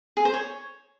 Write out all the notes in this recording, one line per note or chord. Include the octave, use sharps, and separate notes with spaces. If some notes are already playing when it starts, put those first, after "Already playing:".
G#4
C5
C#5